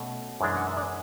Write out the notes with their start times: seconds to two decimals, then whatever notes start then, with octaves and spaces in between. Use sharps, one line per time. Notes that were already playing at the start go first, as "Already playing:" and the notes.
Already playing: B2 A3 C#4
0.41 F#2 E3 G#3 D4
0.57 F#5
0.67 E5
0.77 D4 D5